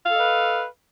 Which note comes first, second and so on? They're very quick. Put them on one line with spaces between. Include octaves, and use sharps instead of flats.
F5 A4 D#5 B4